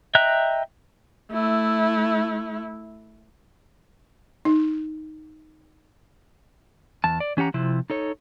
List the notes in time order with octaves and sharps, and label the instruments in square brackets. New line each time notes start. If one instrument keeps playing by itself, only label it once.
[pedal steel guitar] D#5 E5 G5 A#5 F#6
[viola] A3 E4
[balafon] D#4
[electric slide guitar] E2 A5
D5
E3 C#4 G4 F#5 A#5
C3 F3 E4
D#4 A4 C#5